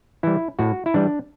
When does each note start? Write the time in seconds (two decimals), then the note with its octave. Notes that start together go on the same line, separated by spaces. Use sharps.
0.23 E3 G3 E4
0.59 A2 F#4
0.86 E4
0.94 E3 G3 D4